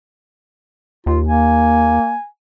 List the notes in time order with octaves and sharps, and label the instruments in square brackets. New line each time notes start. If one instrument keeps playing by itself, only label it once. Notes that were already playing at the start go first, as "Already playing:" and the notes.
[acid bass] D#2 [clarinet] F4
[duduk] A#3 [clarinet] G#5